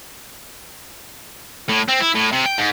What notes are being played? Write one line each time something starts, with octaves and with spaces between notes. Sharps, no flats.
A2
C4
E4
A2
C3
G5
G#2